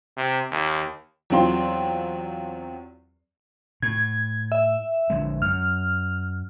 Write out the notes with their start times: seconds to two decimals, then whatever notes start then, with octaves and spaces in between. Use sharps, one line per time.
0.17 C3
0.51 D#2
1.30 E2 F#3 C4 F4 C6
3.82 A2 G#6
4.52 E5
5.10 A#1 D3 G#3
5.42 F#2 F6